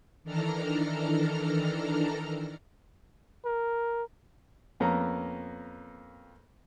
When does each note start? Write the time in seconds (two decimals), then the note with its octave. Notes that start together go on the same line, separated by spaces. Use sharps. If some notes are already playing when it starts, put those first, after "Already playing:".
0.24 D#3 E3 D4 A4 A#5 F6
3.45 A#4
4.80 F2 A#3 B3 C#4 A#5